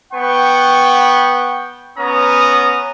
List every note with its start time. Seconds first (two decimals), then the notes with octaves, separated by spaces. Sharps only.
0.13 B3 F#5 G5 C#6
1.98 B3 C#4 A#5 D#6